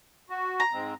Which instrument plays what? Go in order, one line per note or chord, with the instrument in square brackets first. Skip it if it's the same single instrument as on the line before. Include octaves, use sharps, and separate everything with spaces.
[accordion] F#4
[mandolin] A#5
[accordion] G#2 G#3 C4